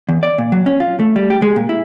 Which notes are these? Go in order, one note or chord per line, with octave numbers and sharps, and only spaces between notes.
E2
D5
A#2
F#3
C#4
F4
A3
G3
G4
G#3
A#2
E4